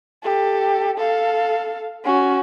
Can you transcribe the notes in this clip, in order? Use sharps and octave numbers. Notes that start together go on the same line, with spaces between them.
G4 A4
A4 F5
C#4 F#4